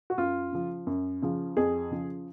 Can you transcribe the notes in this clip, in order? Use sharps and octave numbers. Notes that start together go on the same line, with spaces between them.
F#4
F#2 F4
C#3 F3
F#2
C#3 F3
F2 G#4
C#3 F3